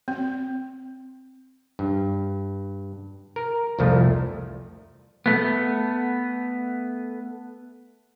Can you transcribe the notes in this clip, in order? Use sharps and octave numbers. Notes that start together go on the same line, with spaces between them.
C4
G2
A#4
C2 F2 F3 A3
A3 B3